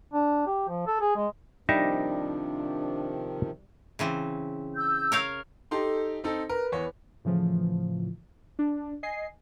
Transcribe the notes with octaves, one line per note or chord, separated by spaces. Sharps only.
D4
G4
F3
A4
G#4
G#3
C3 D#3 F3 G3 D4 D#4 A#4 E5
C#3 E3 C4
E6 G6
A#4 C#5 F5
D#4 G4 A4 C6
C4 D#4 A4
A#4 B4
E2 C#5
A2 C#3 E3 F3
D4
D#5 G#5 C7